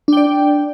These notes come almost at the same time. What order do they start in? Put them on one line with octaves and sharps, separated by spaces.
D4 G5 D5